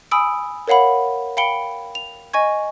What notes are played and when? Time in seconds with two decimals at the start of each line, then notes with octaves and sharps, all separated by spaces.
0.11 G#5 B5 D#6 E6 D7
0.68 A#4 C#5 F5 F#5 B5
1.37 F5 G5 B5 C#7 D7 G7
1.95 F7
2.34 D#5 G#5 C#6 G#6